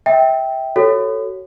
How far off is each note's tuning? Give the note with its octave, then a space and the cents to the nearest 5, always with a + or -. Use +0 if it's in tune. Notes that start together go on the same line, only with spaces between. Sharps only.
E5 -25 G5 +0
F#4 +30 A4 +5 C#5 +0